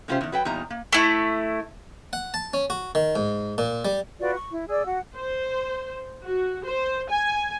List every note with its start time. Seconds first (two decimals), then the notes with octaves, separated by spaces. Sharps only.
0.08 C3 G#3 C#4 F4 G4 C5
0.21 E2 D#3
0.32 F#3 B4 G5
0.45 E2 A#2 G3 D#4 A#5
0.70 A#3
0.93 A3 E4
2.13 F#5
2.34 A5
2.53 C#4
2.70 F#4
2.95 D#3
3.16 G#2
3.58 A#2
3.85 G3
4.20 F4 F#4 B4 D5
4.35 C#6
4.52 E4
4.69 G#4 D5 E6
4.86 F#4 F#5
5.16 C5
6.25 F#4
6.65 C5
7.09 G#5